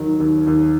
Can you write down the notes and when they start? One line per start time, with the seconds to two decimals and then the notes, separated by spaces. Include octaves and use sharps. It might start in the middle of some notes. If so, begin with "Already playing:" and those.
Already playing: D#2 D#3 F#3
0.20 D#2
0.47 D#2